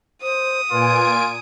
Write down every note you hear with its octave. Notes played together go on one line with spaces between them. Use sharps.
C5 D#6
A#2 F4 B4 G#5 D7